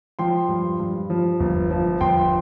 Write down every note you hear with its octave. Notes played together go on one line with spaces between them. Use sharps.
F3 G5 C6
G2
G2
F3
G1
F3
G1 G5 C6